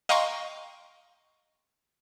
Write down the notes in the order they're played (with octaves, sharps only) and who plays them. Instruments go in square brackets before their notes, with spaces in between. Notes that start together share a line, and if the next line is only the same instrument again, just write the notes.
[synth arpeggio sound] D#5 F5 G5 A#5 C6 C#6